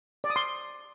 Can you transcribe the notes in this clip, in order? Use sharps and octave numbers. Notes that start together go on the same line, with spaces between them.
D5
D#6
C6